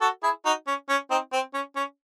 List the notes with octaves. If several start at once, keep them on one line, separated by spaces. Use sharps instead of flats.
F#4 A4
E4 G#4
D#4 F#4
C#4
C#4
C4 D#4
C4
C#4
C#4